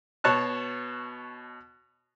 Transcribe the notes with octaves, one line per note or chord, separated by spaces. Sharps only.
B2 C#5 A5 F#6